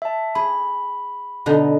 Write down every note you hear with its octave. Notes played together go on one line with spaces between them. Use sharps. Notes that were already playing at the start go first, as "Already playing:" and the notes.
E5 A5
G#4 B5
B2 D3 D#4